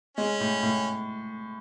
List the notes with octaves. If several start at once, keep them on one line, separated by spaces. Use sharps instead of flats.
G#3 C#4
A2
A2